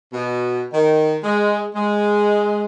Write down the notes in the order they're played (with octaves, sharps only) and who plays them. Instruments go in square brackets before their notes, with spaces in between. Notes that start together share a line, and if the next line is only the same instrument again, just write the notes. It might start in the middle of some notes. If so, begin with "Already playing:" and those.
[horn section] B2
D#3
G#3
G#3